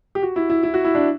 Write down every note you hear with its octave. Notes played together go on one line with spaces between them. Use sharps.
G4
F#4
E4
E4
E4
F#4
E4
D4